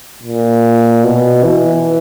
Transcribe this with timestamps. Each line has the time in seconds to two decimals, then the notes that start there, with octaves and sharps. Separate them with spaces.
0.23 A#2
1.04 B2
1.44 E3